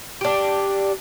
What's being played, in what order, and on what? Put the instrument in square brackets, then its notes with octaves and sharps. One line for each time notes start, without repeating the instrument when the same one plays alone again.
[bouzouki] D4 G4